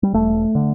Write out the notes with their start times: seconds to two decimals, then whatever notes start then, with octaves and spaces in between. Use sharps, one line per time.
0.03 G3
0.13 E1 A3
0.55 D3